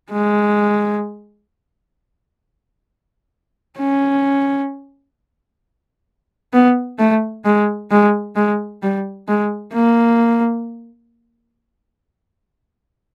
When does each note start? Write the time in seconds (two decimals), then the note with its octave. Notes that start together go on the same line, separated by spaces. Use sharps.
0.12 G#3
3.78 C#4
6.53 B3
6.99 A3
7.45 G#3
7.91 G#3
8.36 G#3
8.83 G3
9.28 G#3
9.73 A#3